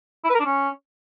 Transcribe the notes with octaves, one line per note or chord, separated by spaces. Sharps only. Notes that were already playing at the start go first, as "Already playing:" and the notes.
E4
B4
A#4
D4
C#4